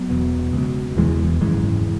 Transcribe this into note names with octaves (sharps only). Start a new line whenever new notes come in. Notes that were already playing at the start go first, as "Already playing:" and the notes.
Already playing: F#3 B3
E1 E2 B2
C#2 B2
E1 E2 B2 E3 G#3
G#1 F#2 C#3 E3 G#3